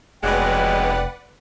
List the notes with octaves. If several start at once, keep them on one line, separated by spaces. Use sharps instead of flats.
F1 B2 F#3 G#3 B4 D5 F#5 G5